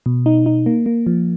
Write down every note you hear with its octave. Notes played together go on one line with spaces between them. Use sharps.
B2
D#4
D#4
A#3
A#3
F3